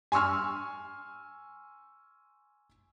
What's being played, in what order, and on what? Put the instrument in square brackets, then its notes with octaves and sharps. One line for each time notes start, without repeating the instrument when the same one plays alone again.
[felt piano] G#5 C6 C#6 E6 F6